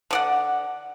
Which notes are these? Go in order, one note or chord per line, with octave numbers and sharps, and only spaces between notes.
D3 D5 F#5